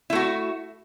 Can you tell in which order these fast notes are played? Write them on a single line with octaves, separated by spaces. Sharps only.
E4 A3 F#4